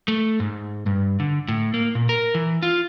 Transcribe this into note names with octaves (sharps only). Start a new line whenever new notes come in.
A3
G#2
G2
D3
A2
A#3
A#2
A#4
E3
F4